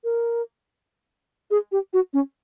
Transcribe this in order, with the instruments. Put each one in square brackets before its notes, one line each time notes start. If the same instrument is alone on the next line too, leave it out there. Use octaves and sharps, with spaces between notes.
[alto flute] A#4
G#4
G4
F#4
C#4